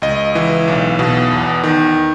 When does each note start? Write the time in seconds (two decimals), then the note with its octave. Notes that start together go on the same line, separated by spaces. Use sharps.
0.02 C#2 D#5
0.35 E3
0.68 B1
0.99 B2
1.32 E2
1.63 D#3